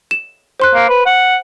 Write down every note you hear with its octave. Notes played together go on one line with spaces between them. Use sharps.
E7
C5 C6 F#6
A#3
B4
F#5